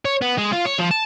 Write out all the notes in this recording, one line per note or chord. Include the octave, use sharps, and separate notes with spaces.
C#5
B3
G#3
F4
C#5
F3
A5